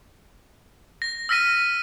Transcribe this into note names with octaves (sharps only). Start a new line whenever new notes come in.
A#6
E6 F6 A#6 B6 D#7